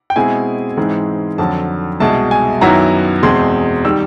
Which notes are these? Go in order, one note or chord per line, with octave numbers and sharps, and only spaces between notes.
G5
B2 G#3 C4 E4 G#5
G#2 E3 G#3 C4
F2 D3 F#3 A5
C2 B2 G#3 A5
G#5
F#2 D#3 F#3 B3 E4 A#5
E2 B2 G#3 C4 C6
D#3 G3 E6